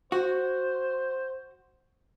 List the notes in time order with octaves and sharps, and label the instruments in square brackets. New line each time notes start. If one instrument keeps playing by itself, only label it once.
[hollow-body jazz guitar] F#4 [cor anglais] C5